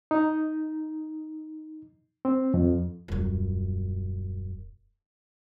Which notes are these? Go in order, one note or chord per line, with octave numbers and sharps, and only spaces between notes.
D#4
C4
F2
D#1 F#2